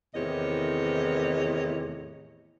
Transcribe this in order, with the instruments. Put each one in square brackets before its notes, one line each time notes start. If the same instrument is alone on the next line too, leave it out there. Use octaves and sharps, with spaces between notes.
[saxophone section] E2 A2 C3 D#3 C#5 D#5